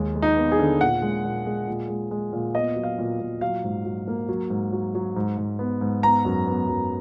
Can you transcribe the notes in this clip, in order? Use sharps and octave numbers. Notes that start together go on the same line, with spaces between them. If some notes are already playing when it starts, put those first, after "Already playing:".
Already playing: D#2 G#3
G#3
D#4
B3
G#4
D3
A#2 F#5
G#3
A#2
G#3
A#2
G#3
G#3
A#2
B3 D#5
F#3
F5
A#2
A#2
F#3 F5
G#2
F#3
A#3
F#3
G#2
F#3
F#3
G#2
G#2
B3
G#2
B3 A#5
F#2
B3
F#2